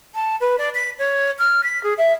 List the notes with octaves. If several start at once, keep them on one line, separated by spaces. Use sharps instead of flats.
A5
B4
D5
B6
C#5
F6
B6
G#4
E5